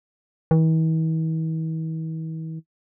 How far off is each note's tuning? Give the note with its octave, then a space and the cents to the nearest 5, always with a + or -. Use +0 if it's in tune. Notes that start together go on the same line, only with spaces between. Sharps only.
E3 -45